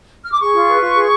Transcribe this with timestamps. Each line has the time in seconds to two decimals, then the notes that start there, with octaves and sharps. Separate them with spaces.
0.23 F6
0.31 D6
0.41 G#4 C#6
0.54 F4
0.68 B4
0.82 F4
0.96 G#4